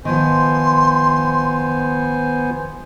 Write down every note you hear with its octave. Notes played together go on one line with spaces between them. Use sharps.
D#3 F3 B3 C5 G#5 C6